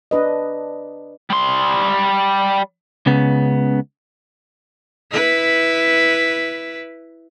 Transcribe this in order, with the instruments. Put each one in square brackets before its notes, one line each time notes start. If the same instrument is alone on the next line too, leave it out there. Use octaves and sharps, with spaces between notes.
[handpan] D4 B4 D#5
[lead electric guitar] G3 C6
[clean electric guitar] C#2 C#3 B3
[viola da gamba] E4 B4